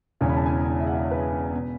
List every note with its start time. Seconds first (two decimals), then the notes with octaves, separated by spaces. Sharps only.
0.21 E1 E2 C#3 E3 C#5
0.29 B5
0.37 A5
0.46 G#5
0.80 E5
0.87 F#5
0.95 E5
1.03 C#5
1.11 B4
1.53 B2